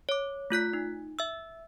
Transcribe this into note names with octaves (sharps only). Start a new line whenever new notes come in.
C#5 D6
A3 F4 F#6 B6
D#4
E5 E6